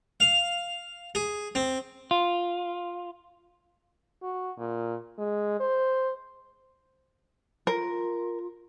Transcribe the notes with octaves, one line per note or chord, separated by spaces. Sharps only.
F5
G#4
C4
F4
F#4
A#2
G#3
C5
F4 A#4